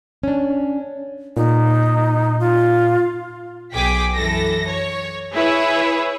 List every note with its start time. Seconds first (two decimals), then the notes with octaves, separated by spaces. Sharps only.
0.23 C#4 D4
1.37 A#2 D#4
2.40 F4
3.73 B1 G#4 G5 D6 B6
4.15 F#2 E3 A4 A#6
4.67 C#5
5.34 E4 G#4 B4 C#5 E5